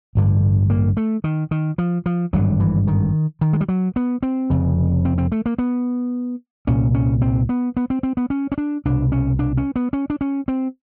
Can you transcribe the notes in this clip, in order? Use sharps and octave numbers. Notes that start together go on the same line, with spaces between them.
A1 G2 D3
A#3
A3
D#3
D#3
F3
F3
G#1 G2 D3 F#3
E3
D#3
D#3
G#3
G3
F#3
B3
C4
F1 F2 C#3
C4
C4
A3
A#3
B3
C2 A#2 C#4
C#4
C4
B3
B3
C4
C4
B3
C#4
C#4
D4
C2 B2 D4
C#4
D4
C#4
B3
C#4
D4
C#4
C4